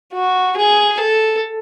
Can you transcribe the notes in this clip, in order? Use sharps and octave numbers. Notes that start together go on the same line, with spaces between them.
F#4
G#4
A4